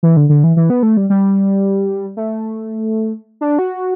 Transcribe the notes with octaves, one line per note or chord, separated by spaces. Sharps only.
E3
D3
D3
E3
E3
B3
A3
G3
G3
A3
D4
F#4